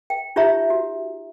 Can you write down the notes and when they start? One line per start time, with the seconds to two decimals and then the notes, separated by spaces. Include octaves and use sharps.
0.10 G5
0.36 D#4 F4 G4 C#5 E5 A#5
0.70 F#4